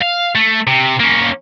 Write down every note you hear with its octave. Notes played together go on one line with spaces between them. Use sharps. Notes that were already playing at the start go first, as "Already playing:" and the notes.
F5
A3
C3
A#3 C#4